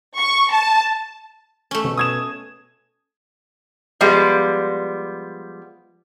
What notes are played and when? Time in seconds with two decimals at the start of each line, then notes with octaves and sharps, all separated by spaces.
0.18 C#6
0.52 A5
1.71 A3 C#4
1.84 B2
1.97 D#6 G#6 E7
4.01 F3 G3 G#3 B3